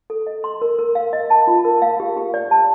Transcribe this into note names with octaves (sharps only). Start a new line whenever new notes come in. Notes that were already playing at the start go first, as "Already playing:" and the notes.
A4
D#5
C6
A#4
A#4
F5
D#5
A5
F4
A#4
F5
G4
G4
D5
A5